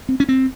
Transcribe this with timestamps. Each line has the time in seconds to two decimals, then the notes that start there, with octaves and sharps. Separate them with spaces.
0.09 C4
0.20 C#4
0.29 C4